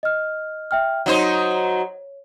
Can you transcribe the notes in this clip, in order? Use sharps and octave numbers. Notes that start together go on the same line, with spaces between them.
D#5 F6
E5 G5 F6
F#3 D#4 C5 C#5